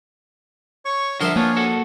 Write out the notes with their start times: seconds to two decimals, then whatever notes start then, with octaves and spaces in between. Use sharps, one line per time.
0.85 C#5 C#6
1.21 D3 F3 A#4 E5 C6
1.36 A#3 B3 D4 F4 C#5 G#5
1.57 F#4 A4